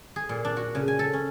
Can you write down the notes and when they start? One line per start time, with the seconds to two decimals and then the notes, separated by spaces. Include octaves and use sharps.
0.16 G#4
0.29 A#2
0.45 D4
0.57 F#4
0.75 C#3
0.88 G#5
0.99 A4
1.13 C#4